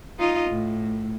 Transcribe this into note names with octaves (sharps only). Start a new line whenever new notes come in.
D#4 F4 D#5
A2